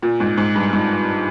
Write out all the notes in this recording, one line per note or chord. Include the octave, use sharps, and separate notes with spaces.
A#2
G#2
G#2
G2
G#2